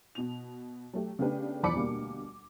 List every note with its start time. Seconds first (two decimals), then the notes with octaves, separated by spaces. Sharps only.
0.15 B2 F7
0.94 F#3 A3 G4
1.19 C#3 A3 B3 D4 G4 B4
1.63 E2 F3 D5 B5 D6 C#7
1.75 D2 B2 G3 A#3